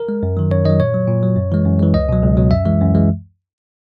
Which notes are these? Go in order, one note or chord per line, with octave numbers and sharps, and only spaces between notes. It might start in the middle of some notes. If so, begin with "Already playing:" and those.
Already playing: A#4
G#3
F#2
D#3 F#3
F#2 C#5
D#3 F#3 D#5
A#2 C#5
F#3
A#2
F#3
F#2
E3 G#3
F#2
E3 G#3
C#2 D#5
B2 F#3
C#2
B2 F#3
F#2 E5
E3 G#3
F#2
E3 G#3